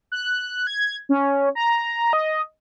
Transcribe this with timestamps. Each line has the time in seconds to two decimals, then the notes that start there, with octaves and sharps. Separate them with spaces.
0.12 F#6
0.67 G#6
1.09 C#4
1.55 A#5
2.13 D#5